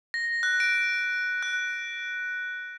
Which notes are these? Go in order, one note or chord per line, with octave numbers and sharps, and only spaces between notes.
A#6
F#6
D7
F#6